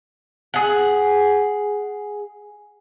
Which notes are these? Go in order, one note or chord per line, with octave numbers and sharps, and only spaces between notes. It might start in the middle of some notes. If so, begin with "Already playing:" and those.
G#4 F#5